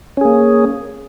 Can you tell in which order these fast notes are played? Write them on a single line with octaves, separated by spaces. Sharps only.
C#4 G#4 A#3